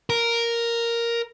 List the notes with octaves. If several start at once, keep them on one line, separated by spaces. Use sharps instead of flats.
A#4